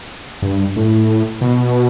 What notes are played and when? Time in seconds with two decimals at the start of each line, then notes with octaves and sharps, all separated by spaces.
0.42 G2
0.76 A2
1.41 B2